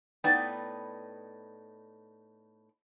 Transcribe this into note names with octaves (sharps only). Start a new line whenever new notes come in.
A2 B3 D#4 B4 D5 G5